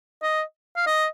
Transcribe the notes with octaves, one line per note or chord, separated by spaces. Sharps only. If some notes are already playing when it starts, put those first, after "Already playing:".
D#5
F5
D#5